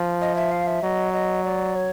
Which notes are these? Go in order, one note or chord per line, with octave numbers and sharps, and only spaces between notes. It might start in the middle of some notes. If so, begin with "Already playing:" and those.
Already playing: F3
D#5
E5
F5
E5
F#3 D#5
D#5
D5
C#5